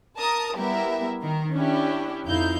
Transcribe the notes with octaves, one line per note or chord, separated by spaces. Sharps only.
A#4 A5 A#5 D#6
G3 B3 E4 G4 A#4 E5
D#3 A#4
C#4 D4 E4 G4
F2 D#4 E4 F5 G6